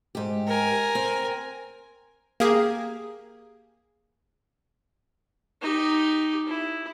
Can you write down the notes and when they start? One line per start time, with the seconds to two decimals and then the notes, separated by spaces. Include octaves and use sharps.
0.15 G#2 G4
0.47 A#4 G#5
0.95 C4
2.40 A#3 G4 G#4
5.62 D#4 G4
6.48 E4